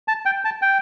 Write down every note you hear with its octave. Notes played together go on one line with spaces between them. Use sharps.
A5
G5
A5
G5